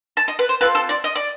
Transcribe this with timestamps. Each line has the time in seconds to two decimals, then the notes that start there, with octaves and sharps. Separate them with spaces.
0.17 A5
0.28 D#5
0.39 B4
0.49 C5
0.61 C4 F4 A4 B4
0.75 A4
0.89 D5
1.04 D#5
1.15 D5